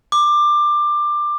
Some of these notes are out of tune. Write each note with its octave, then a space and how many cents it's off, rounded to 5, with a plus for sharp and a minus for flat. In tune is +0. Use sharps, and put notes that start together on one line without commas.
D6 +20